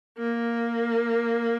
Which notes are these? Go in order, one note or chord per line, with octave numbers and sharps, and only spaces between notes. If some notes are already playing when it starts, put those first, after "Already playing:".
A#3